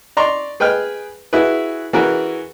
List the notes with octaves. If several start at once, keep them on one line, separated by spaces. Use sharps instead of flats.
D5 A#5 C6 C#6
G#4 B4 G5 G#5 F6
E4 F#4 G#4 B4
E3 F#4 G#4 A#4 B4